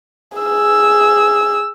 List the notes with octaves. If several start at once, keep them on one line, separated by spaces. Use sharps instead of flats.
G#4 E6